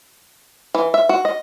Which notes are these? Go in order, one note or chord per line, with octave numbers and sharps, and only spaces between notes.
E3
E5
F#4
D#5